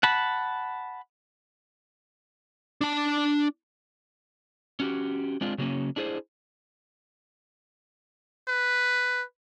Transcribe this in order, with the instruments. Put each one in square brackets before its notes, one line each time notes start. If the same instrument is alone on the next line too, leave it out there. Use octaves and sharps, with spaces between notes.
[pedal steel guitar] F#5 A5 B5
[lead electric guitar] D4 A5
[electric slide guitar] C#4 F#4 G4
G#3 C4 D4 F4
C#3 F#3 A#3 C#4
D4 E4 G#4 B4 C5
[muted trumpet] B4